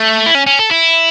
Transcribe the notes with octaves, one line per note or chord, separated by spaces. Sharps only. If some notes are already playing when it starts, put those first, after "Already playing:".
Already playing: A3
E4
C#4
C#4
A4
E4